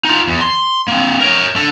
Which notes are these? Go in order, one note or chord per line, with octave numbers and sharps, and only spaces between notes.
D#4 F4
E2
C6
A#3 C4
A#4 C#5
D4 A4